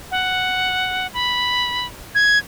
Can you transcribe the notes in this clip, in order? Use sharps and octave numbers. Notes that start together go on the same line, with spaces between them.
F#5
B5
G#6